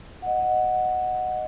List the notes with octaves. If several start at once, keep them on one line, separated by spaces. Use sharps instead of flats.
D#5 F#5